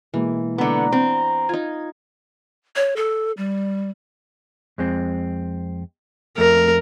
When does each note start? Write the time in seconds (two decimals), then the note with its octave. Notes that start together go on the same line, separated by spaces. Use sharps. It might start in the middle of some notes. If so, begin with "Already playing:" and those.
0.14 B2 E3 G#3 A#3
0.58 D3 B3 A#5
0.92 C4
1.49 D#4 F4 G#6
2.76 C#5
2.96 A4
3.37 G3
4.78 F2 G#3 C4
6.38 F2 A3 A#4